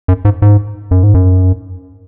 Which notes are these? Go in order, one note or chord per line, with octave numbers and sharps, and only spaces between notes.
F#2
G#2
G#2
F#2
G#2
F#2